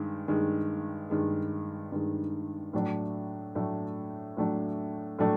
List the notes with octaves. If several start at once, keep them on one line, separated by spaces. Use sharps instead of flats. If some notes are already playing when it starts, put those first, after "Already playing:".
Already playing: G2 D#3 G#3
G2 D#3 G#3
G2 D#3 G#3
G2 D#3 G#3
A2 F#3 A3 D4
A2 F#3 A3 D4
A2 F#3 A3 D4
A2 F#3 A3 D4